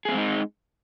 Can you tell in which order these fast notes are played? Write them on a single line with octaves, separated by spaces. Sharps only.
G#4 B3 C4 G#3 D#4